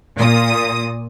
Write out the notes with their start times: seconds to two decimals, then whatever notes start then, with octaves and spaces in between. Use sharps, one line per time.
0.17 A#2 D#6